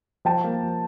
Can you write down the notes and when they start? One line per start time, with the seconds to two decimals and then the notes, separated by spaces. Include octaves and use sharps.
0.25 F3 G5 A5
0.44 A#3
0.63 F3